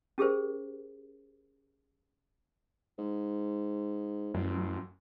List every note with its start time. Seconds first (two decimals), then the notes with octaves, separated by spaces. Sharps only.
0.18 C#4 G4 G#4 A#4 C5
2.98 G#2
4.34 A1 F#2